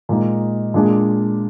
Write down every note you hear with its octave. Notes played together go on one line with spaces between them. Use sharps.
A#2 G#3 D#4
A#2 G#3 D4 G#4